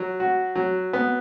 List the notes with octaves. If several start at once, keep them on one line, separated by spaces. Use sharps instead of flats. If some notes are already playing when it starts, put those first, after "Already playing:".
Already playing: F#3
F#4
F#3
B3